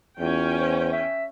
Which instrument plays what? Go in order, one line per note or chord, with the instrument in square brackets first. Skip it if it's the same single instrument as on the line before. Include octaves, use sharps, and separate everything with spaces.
[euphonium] E2 [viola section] C#4 G5 [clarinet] F4
[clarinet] C5
E5